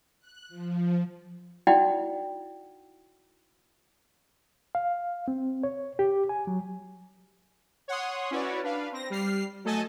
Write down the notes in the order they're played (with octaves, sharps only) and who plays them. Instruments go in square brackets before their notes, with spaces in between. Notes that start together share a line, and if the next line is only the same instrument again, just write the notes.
[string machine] F#6
F3
[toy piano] D#4 E4 F#4 D5 F#5 G5
[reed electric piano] F5
C4
C#5
G4
G#5
F#3
[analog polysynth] C#5 F#5 C6 D#6
C#4 E4 F#4 B4 C#5 D5
D4 B4 F5
C4 A#6
G3 F6 C7
F#3 A3 A4 D#5 G#5 A5